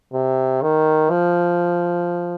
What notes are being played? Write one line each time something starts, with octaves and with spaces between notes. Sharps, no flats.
C3
D#3
F3